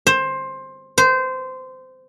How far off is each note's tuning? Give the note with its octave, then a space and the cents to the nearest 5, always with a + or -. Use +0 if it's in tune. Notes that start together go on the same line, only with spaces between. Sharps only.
C5 +15
C5 -20